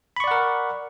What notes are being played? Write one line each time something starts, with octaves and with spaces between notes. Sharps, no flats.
A#4 D5 F#5 B5 C#6